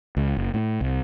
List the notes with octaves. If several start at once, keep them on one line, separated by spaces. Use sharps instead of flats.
C#2
F#1
A2
C2